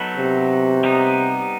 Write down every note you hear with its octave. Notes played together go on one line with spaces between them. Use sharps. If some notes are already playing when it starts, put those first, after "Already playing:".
Already playing: F#3 B3 D#4 F#4 A4
C3
G3 B3 D#4